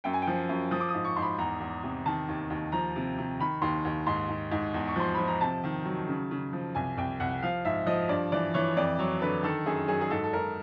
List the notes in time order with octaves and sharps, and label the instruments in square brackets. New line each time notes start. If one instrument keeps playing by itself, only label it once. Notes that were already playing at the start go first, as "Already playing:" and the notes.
[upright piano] F#2 G5
G#5
G5
F3
F#2
F3 D#6
D6
D#6
G#2
C#6
G#2 C6
B5
E2 A#5
E2
C3
D#3 A5
D#2
D#2
F3 A#5
C3
C3
D#3 B5
D#2 C6
D#2
G#2 C6
G#2
G#2
E2
C#6
F3 C6
F3 B5
A#5
C3 A5
D#3
F#3
C#3
C#3
F3
C2 G#5
C2 G5
C2 F#5
F3 F5
G#2 E5
F3 D#5
G2 D5
E3 D5
E3 C#5
F2 D5
F#3 C#5
D3 B4
D#3 A4
F#2 G#4
F#3 G#4
G#4
G#2 A4
A4
G#2 A#4